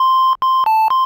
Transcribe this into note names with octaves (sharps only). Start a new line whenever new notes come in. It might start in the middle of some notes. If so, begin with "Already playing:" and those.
Already playing: C6
C6
A5
C6